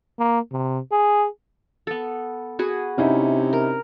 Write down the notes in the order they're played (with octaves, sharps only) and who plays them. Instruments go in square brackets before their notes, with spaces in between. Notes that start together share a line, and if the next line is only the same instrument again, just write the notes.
[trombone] A#3
C3
G#4
[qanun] B3 A4
F#4 G#4 B4
[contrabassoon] C3 [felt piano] C#4 D#4 E4
[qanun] A#4